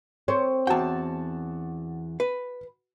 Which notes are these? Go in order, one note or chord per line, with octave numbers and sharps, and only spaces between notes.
C4 C#5
E2 F#4 G5 A5
B4